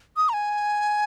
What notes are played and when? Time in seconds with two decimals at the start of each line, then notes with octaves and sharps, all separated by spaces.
0.17 D#6
0.29 A#5
0.33 G#5